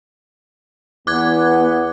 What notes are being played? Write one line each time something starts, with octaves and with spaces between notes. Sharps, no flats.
E2 B3 D6 F#6 G#6